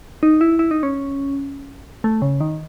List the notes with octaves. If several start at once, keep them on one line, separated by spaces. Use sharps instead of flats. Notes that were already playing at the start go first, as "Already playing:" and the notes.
D#4
E4
E4
D#4
C#4
A3
C#3
D#3